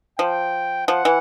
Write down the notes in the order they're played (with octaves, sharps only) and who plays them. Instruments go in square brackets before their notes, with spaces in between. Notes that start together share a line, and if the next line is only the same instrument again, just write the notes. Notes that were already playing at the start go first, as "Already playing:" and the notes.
[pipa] F3 [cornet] G5
[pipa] F3 [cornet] F#5
[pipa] E3